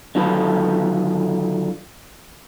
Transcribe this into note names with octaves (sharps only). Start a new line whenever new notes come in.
D3 D#3 F#3 F4 A4 B4